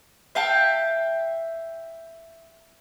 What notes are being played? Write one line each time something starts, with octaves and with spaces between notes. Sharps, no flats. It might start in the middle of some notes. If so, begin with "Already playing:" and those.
E5 F5 G5 A5